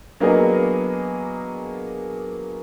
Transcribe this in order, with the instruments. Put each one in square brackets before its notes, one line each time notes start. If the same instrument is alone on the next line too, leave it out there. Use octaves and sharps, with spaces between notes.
[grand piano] F#3 A#3 B3 D4 G#4 D#5